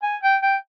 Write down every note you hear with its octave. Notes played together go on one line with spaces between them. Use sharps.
G#5
G5
G5